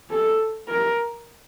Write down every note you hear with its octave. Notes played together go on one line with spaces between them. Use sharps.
A4
A#4